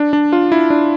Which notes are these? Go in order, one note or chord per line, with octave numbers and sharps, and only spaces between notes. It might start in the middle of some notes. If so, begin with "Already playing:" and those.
Already playing: D4
D4
F4
E4
D4